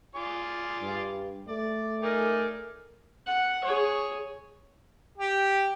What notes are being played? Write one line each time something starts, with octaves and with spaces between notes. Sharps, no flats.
F4 G#4 D5
G2
A3 D5
D#4 G#4 A#4 D5
F#5
G#4 C#5
G4